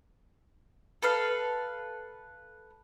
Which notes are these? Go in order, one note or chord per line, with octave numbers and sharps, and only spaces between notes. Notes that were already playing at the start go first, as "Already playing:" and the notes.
A4 B4 F5